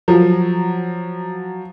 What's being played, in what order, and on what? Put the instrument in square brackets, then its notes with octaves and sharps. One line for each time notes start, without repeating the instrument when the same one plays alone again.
[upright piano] F3 F#3